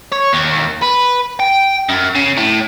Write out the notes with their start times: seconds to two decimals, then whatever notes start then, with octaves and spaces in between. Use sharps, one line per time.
0.13 C#5
0.34 D#2
0.83 B4
1.40 G5
1.89 F#2
2.15 C#3
2.37 A2